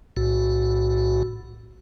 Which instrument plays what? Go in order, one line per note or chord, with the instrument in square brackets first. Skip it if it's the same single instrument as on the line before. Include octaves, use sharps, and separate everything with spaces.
[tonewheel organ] B1 A2 F#4